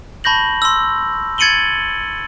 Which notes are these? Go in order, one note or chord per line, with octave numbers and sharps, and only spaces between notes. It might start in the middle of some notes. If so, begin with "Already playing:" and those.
A5 B5 C#6 G6 A#6 F#7
C6 E6
G#6 A6 C#7 D#7 F#7 G7